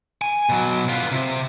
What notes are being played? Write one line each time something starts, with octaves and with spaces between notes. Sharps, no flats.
G#5
B2 F#3
B3 F4
C3